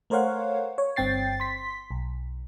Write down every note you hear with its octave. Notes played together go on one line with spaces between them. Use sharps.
A3 A#4 C5 C#5 F5 F#5
C#5
G1 G2 C4 G5 A6 C7
C6 B6
B1